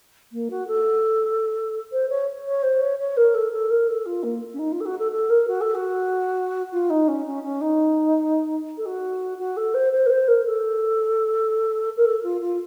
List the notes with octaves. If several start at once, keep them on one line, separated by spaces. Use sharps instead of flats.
A#3
F#4
A4
C5
C#5
C#5
C5
C#5
C#5
A#4
A4
A4
A#4
A4
F4
A#3
C#4
D#4
F4
A4
F#4
A4
A4
A#4
F#4
A4
F#4
F4
D#4
C#4
C#4
C#4
D#4
A4
F#4
F#4
A4
C5
C5
A#4
C5
A#4
A4
A#4
A4
F4
F4